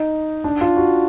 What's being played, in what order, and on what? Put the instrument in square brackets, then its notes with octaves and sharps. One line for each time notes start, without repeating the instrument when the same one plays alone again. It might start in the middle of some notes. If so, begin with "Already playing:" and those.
Already playing: [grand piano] D#4
D4
F4
F#4